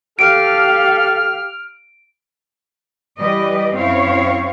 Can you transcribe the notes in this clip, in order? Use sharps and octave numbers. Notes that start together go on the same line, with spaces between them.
G4 A4 F5 F6 D7
E3 G3 B4 D#5
F#2 C4 E4 C#5 F5